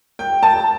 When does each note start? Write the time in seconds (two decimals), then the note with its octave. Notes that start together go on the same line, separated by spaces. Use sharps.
0.19 G5
0.43 A5